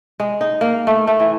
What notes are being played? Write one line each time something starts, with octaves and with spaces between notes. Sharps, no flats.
G#3
D#4
A#3
A3
A3
E3